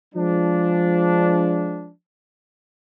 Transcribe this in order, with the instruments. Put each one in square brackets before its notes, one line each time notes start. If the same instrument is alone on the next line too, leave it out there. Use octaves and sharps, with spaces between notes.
[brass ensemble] F3 G#3 D4